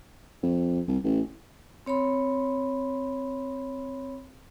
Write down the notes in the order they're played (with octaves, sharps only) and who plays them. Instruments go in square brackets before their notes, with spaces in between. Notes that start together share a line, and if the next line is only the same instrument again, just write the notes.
[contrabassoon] F2
C2
A1
[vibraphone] C4 C#5 B5 C6